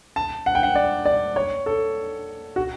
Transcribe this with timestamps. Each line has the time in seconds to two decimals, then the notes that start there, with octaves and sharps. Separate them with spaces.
0.16 A5
0.46 F#5
0.55 G5
0.63 F#5
0.75 D5
1.06 D5
1.36 C#5
1.66 A4
2.56 F#4